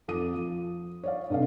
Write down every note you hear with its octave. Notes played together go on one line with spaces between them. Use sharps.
F2 A4 D6 D#6 D#7
F3
C#5 D5 F5
G2 C3 A4 D#5 F5